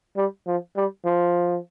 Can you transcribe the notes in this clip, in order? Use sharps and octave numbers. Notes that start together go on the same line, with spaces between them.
G3
F3
G3
F3